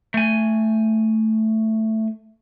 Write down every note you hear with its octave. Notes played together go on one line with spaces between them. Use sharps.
A3 G#5